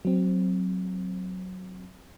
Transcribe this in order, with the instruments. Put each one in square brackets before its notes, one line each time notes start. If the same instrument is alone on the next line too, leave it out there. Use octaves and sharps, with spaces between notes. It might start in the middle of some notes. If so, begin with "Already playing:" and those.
[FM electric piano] F#3 C4